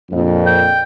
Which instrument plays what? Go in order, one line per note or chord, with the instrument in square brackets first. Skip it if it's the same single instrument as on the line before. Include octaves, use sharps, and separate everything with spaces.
[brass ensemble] A#1 F2
[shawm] G5